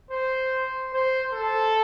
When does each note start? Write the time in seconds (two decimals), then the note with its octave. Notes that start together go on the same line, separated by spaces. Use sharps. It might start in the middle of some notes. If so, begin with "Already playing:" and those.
0.11 C5
0.93 C5
1.33 A4